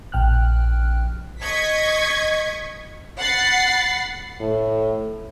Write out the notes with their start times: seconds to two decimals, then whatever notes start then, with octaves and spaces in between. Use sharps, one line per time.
0.12 A#1 G5 F6 F#6
1.41 D#5 C#6 G#6 B6
3.19 F#5 B5 A6 C7
4.40 A2